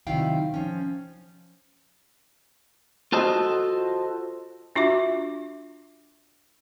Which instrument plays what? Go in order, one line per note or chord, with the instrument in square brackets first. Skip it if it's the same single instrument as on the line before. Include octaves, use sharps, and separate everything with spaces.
[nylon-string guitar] C3 D#3 F#3 E4 F5 G5
F3 C#4
[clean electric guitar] F4 F#4 A4 C5 D#5
[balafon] D4 F4 F#4 E5 D6